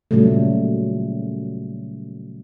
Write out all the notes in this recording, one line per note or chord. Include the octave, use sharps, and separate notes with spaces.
A#2 C#3 F#3 G3 A3